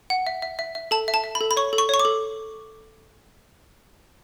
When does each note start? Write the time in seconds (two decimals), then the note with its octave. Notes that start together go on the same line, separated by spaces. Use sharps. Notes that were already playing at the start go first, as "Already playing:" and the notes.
0.10 F#5
0.27 E5
0.42 E5
0.59 E5
0.75 E5
0.91 A4 A5
1.08 E5
1.14 A5
1.24 E5
1.35 B5
1.41 A4
1.51 B5
1.57 C#5 C#6
1.73 A4
1.78 C#6
1.89 C#5 C#6
1.99 D6
2.05 A4